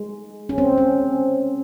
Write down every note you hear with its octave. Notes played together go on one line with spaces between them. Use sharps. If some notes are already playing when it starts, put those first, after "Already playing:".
Already playing: G#3
C#4
C4
C#4